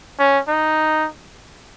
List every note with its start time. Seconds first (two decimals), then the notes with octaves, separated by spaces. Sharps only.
0.19 C#4
0.48 D#4